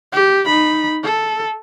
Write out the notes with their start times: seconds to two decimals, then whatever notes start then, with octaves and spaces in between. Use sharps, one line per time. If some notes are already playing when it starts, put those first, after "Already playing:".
0.13 G4
0.46 D#4 B5
1.03 A4